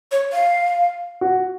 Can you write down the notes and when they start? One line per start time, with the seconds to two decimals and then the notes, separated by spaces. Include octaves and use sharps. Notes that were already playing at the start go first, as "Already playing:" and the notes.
0.12 C#5
0.33 F5
1.21 F#4